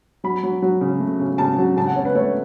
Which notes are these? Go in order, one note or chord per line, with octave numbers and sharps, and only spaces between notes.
F#3 B5
F#3
F#3
C#3
A3
C#3
C#3 A5
F#3
C#3 A5
F#5
C#3 C#5
B4
A3 C#5